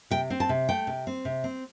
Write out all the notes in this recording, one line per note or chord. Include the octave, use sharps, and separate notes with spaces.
C3 G5
C4
A5
C3
A3 G5
C3
C4
C3
C4